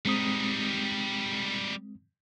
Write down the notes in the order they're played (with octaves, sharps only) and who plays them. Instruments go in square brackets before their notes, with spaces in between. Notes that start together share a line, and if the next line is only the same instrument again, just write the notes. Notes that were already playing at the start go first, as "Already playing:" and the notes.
[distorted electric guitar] G3 D#4 [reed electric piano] G#3 C4 D#6